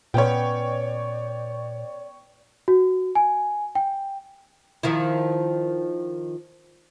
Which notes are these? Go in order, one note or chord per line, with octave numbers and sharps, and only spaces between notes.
A#2 B3 C#4 C#5 D5 G5
F#4
G#5
G5
D#3 F3 E4